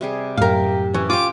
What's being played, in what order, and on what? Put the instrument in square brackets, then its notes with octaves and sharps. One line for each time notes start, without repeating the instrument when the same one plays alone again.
[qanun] C3 G3 G#4
[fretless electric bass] F#2 A2 [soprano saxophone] G4 [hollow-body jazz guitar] A#4 F5
[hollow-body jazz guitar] E3 [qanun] C#4
[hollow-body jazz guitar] F4 G4 [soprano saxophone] D6